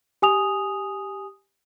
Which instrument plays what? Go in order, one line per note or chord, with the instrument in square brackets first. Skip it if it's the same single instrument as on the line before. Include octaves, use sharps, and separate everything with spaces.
[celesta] G4 G#5 D#6 F7